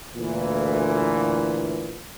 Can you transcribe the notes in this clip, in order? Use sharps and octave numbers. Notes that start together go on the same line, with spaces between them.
D2 A#2 E3